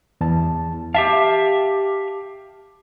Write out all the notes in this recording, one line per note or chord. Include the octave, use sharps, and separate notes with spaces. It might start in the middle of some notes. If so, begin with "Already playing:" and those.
E2 A5
G4 E5 F5 A5